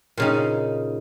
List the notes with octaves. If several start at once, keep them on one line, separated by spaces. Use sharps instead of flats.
A#2 C#3 D#4